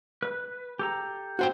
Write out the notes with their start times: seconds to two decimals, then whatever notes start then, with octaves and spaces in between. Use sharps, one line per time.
0.22 B4
0.79 G4 A4 A#5
1.39 F#4 C5 G5